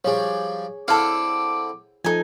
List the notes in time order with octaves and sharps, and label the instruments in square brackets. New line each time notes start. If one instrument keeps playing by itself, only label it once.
[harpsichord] F3 G3 D4 [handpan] G#4 C#5
[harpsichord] D3 C4 E4 [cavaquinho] A4 F5 [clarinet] D6
[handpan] F3 A4 [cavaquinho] D#4 G#5